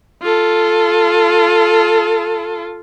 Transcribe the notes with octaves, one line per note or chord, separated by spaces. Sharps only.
F4 A4